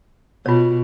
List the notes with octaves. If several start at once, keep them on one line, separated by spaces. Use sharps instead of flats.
B2 F4 C#5